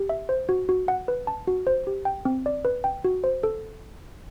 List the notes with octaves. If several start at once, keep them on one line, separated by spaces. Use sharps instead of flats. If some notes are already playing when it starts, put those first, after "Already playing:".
Already playing: G4
E5
C5
F#4
F#4
F#5
B4
A5
F#4
C5
G4
G5
C4
D5
B4
G5
F#4
C5
A4